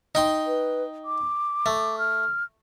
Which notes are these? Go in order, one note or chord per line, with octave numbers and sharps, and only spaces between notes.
D#4 G5 C6
B4
D6
A3
F6